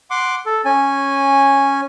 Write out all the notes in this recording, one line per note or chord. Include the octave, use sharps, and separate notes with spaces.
F#5 C6 D6
A4
C#4 G#5